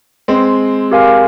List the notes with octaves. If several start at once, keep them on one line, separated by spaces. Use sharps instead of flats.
G#3 C4
G4 A#4 F5 G#5